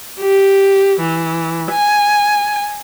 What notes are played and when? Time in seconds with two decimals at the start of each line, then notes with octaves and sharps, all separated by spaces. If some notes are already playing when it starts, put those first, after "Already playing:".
0.19 G4
1.00 E3
1.71 G#5